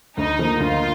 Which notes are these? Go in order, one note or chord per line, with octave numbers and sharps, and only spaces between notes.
D2 D#4
D3 F3 A#3
D2 F4